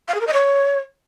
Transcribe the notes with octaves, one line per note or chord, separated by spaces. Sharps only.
F5
G#4
A#4
D#5
C#5